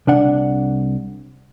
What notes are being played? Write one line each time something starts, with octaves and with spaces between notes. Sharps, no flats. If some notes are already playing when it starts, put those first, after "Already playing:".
C2 D4 F#5